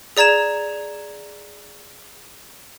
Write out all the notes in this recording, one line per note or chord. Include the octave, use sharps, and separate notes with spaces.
G#4 D5 A#5 G#6 E7